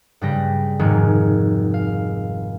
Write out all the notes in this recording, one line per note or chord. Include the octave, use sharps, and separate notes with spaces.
G2 C#3 G3 B4 G5 A#6
F1 G#2 D#3 G#3 F#4 F6
F5